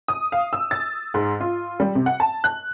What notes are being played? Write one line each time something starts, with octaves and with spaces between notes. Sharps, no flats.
D#6
F5
E6
A6
G#2
F4
G3
C3
F#5
A5
F#6